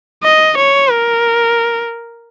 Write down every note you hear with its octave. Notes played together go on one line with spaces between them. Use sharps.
D#5
C#5
A#4